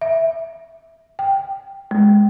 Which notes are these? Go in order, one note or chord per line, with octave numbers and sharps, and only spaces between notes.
E5
G5
G#3